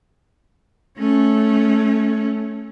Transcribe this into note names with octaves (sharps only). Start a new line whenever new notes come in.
A3 C#4